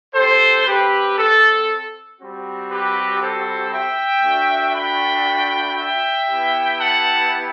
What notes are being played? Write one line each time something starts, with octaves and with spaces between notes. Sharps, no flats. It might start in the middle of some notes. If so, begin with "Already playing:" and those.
C4 G4 A4 C5
G4 B4
A4
G3 C4 F#4
G4 B4
A4 C5
E5 G5
A3 D4 F#4
G5 B5
E5 G5
B3 E4 G4
F#5 A5